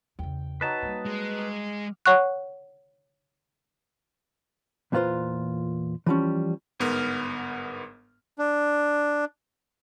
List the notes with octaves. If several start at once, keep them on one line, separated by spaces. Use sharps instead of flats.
E2 C#3 G5
F#3 D#4 B4 D#5 A5
G3 A#3
G#3
F5 D6
C#5 F#5 C#6 F#6
E2 A#2 E3 F4 B4 C5
E3 F3 G3 C#4
G1 G#2 B3 A#4 F6
D4